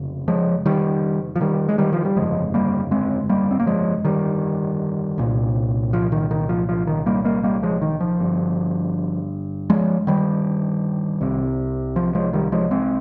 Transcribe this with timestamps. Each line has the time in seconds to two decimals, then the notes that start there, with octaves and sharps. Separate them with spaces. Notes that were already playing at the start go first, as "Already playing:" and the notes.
Already playing: F1 C#3
0.28 F3 G#3
0.66 D#3 G3
1.36 F3
1.41 D#3 G3
1.68 G#3
1.78 D#3 G3
1.93 F3
2.05 G3
2.16 G1 F2 C#3 F3 G#3
2.54 G3 A#3
2.91 G#3 C4
3.29 G3 A#3
3.51 C4
3.60 A#3
3.66 F3 G#3
4.05 D#3 G3
5.18 C2 A#2
5.93 F3
6.12 D#3
6.31 D#3
6.49 F3
6.69 F3
6.87 D#3
7.06 G3 A#3
7.24 G3 A#3
7.43 G3 A#3
7.63 F3 G#3
7.82 D#3
8.00 F3
8.19 G1 G2
9.70 F3 G#3
10.07 D#3 G3
11.21 C2 C3
11.96 F3
12.15 F3 G#3
12.33 D#3 G3
12.52 F3 G#3
12.71 G#3 C4